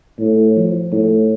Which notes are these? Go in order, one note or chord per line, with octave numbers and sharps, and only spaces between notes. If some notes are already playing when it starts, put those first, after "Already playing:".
A2
F3
A2